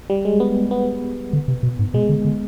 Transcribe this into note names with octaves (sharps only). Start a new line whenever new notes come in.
G3
G#3
B3
B3
D3
C3
B2
G#2
B2 G#3
D3
D3